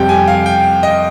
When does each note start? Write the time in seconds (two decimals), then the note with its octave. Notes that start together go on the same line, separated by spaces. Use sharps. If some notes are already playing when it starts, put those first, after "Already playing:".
Already playing: F2 C3 G3 G5
0.09 G#5
0.28 F5
0.46 G5
0.83 D#5